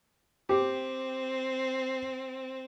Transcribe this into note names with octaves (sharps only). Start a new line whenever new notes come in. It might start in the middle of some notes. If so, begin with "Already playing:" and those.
C4 G4